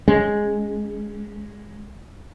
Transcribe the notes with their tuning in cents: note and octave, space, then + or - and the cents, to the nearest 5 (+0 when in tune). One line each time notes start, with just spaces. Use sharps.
G#3 +0 C#4 +0